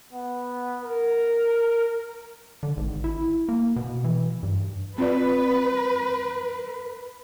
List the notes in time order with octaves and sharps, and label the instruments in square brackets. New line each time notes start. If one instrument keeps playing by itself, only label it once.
[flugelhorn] B3
A#4
[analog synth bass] D3
G#1
E4
A#3
B2
E3
G2
[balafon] C4 F4 D5 [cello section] B4